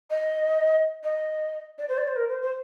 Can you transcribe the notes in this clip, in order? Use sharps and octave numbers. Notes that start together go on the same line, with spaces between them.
D#5
D#5
D5
C5
D5
C5
A#4
C5
C5